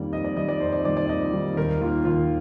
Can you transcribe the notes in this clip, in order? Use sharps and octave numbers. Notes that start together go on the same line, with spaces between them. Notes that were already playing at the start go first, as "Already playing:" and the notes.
Already playing: F2 D#3 G3 A#3 D5
F2 D#5
D5
D#3 G3 A#3 D#5
D5
F2 C5
D5
D#3 G3 A#3 D5
D5
F2 D#5
D#3 G3 A#3
D#2 A#4
D#3 A#3 F4
D#2 F4